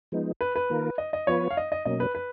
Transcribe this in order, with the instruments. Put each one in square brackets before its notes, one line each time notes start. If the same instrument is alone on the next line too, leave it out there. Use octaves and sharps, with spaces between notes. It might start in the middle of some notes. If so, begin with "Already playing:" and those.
[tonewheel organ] F3 G#3 B3 D#4
[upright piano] B4
B4
[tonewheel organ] D#3 A#3 F4 A#4
[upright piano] D#5
D#5
[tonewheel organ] F3 B3 F4 B4 [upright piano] C#5
[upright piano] F5
D#5
D#5
[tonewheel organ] B2 F#3 A#3 C#4 [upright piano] D#5
[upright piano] B4
B4